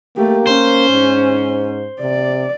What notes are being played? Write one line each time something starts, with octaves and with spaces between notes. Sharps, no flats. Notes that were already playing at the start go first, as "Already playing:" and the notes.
A3 A#3 G4
C#4 C5
G#2
C3 D5